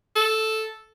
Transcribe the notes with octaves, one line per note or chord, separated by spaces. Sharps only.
A4